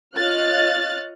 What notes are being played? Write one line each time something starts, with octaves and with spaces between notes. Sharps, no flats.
F4 C#5 D#5 F6 F#6 A6